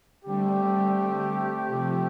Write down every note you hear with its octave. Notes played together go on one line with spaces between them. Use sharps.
D3 G3 A3 C4 G4
C3 F3